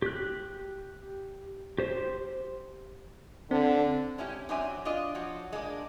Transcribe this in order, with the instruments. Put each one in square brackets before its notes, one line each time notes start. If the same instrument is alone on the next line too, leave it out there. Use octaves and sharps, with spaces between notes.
[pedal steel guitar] G4 F#6
G4 C5
[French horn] D3 [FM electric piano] C4
[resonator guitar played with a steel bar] G#3 C#4 E4 G4
F#2 F#3 C4 D4 E5 G#5
D4 F4 D#5
F3 F#3 F#4
G#3 A#3 D4